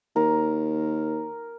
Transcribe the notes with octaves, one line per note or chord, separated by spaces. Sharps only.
D#2 A#4